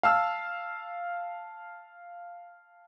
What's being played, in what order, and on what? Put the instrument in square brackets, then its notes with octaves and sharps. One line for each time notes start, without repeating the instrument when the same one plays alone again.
[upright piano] F5 A5 E6 F6